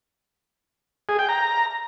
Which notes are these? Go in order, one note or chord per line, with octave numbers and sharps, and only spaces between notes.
G#4
G5
A#5